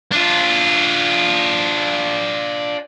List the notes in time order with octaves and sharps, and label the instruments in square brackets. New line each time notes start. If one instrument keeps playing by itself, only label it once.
[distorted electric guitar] D4 F4